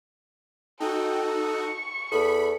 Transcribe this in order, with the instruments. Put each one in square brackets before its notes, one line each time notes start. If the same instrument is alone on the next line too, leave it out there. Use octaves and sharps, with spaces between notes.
[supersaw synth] D#4 F#4 [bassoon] A4 [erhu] G5
[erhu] C#6
[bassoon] E2 [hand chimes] A4 [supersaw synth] B5